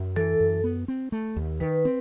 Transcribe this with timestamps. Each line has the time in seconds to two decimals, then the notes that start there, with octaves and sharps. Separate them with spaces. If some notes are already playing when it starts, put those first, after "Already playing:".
Already playing: F#2
0.16 E3 A4
0.40 F#2
0.64 B3
0.88 C4
1.12 A3
1.36 D#2
1.60 D#3 B4
1.85 C4